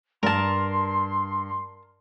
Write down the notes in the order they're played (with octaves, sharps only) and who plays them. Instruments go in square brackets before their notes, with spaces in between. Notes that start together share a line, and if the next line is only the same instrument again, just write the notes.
[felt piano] G2 [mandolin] A#4 A5 [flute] C6